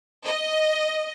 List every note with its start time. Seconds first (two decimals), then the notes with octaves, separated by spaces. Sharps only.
0.25 D#5